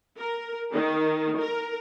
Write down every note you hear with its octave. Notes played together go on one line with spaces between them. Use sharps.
A#4
D#3
A#4